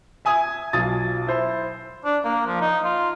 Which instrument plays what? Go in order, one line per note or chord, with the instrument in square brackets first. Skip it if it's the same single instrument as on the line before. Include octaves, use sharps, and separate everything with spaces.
[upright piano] E5 G#5 D#6 G#6
B1 F4 D#6 A6
E4 C5
[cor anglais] D4
A#3
F3
D#4
F4